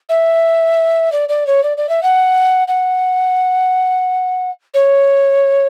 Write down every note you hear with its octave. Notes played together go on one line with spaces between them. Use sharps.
E5
D5
D5
C#5
D5
D5
E5
F#5
F#5
C#5